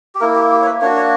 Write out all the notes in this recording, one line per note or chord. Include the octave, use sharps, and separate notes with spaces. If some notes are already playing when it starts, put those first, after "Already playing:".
G4
A#3 E4 A#4
G4
G4
C#5
B4
A#3 D4 F#4 C#5
C#5